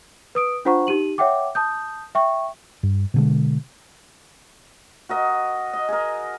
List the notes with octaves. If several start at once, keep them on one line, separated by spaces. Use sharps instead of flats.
B4 D#6 D7
D4 F4 C5 F#5 A#5 C#6
D#4 G4 D#7 F#7
C#5 E5 F#5 G5 D6
A5 D#6 G6
E5 G5 C#6
G2
B2 D3 G#3
F#4 A#4 D#5
D#5
G#4 A#4